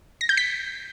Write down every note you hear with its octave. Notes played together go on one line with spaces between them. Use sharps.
A#6
G6
B6